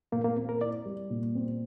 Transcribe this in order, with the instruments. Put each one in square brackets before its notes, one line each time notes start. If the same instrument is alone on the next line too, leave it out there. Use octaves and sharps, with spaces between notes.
[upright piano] A#2 [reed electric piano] A#3
[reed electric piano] A#3
[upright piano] C4
[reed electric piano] A#4
[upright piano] E4 [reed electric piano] D5
[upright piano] G3
A#2
C4